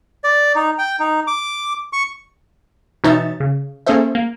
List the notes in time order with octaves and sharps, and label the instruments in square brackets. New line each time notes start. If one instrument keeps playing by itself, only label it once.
[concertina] D5
D#4
G5
D#4
D6
C#6
[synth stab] B2 E3 D#4 C#5 E5 A6
C#3
A#3 C#4 G#4 A4 C5 E5
A#3